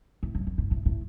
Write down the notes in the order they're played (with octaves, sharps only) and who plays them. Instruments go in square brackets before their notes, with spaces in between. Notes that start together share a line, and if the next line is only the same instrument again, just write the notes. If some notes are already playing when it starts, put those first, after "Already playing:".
[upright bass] A2
F#2
F#2
G#2
A2
A2